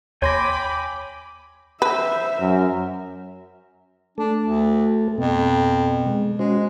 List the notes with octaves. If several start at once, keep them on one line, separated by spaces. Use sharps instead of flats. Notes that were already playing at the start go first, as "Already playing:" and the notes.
D#2 C#5 G5 G#5 B5 C6 D6 A#6
B4 C5 E5
F#2 A#4
A3 D4 A4
D2
F2 B2 B3
G#3
G#3 C#4 F#4 C5